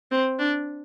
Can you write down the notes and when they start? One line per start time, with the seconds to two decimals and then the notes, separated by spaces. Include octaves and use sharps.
0.11 C4
0.39 D4